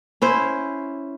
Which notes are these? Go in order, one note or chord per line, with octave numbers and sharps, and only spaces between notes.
C#4 E4 C5